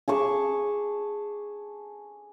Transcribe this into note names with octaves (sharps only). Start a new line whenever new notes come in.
G#4 A5 C#6 D6